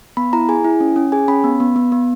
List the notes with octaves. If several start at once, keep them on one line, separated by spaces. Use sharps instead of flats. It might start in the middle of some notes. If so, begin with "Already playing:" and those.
B3 B5
E4 A#5
G#4 G#5
E4
C#4
C#4
G#4 G#5
C#4 B5
B3
B3
B3
B3